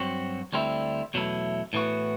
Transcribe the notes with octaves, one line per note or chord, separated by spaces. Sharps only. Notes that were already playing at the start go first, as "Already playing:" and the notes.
Already playing: G2 F#3 C4 F#4
D2 D3 G3 C4 E4
E2 B2 F#3 A3 E4
A2 E3 B3 F#4